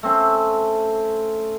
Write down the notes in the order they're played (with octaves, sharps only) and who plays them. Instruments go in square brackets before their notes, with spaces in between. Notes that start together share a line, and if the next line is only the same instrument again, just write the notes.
[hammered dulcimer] A3 C4 C#4